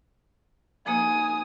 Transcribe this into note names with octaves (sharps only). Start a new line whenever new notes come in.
F3 A#3 D#4 G#5 D#6